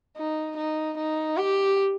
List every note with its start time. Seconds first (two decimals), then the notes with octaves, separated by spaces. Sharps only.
0.16 D#4
0.57 D#4
0.97 D#4
1.37 G4